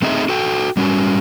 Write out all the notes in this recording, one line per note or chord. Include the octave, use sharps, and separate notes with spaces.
A3 C4 D#4 G#4 D#5 E5
F#4 A4 G5
G3 C#4 F#4